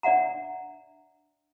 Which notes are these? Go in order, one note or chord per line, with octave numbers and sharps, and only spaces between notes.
D4 D5 E5 F#5 A#5